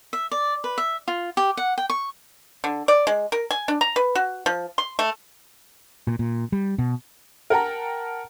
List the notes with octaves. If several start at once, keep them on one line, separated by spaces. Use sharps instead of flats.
E5
D5
B4
E5
F4
G4
F#5
G5
C#6
D3
D5
G#3
A#4
G#5
D4
A#5
B4
F#4
F3
C6
A3
A#2
A#2
G3
B2
A#4 F#5 G5 A5 A#5